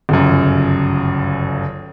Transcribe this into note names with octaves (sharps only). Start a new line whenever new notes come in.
G1 C#2 F#2